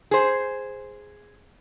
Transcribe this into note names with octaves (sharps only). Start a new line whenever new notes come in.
G#4 C5